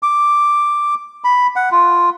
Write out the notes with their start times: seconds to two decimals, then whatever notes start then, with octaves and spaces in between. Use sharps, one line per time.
0.03 D6
1.24 B5
1.56 F#5
1.71 F4